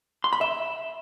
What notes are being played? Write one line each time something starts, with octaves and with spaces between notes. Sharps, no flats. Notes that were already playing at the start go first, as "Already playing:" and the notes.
C6
B5
E5